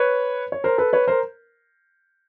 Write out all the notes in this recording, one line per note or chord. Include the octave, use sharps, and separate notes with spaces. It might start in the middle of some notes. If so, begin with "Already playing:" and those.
Already playing: B4 C#5
C#5
A#4 C5
A4 B4
B4 C#5
A#4 C5